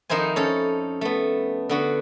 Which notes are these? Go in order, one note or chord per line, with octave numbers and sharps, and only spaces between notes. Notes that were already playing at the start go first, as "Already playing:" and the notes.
F2 D#3 D#4 E4 C5 G#5
C#4 A4 C#5
A3 B3
D3 B3 F#4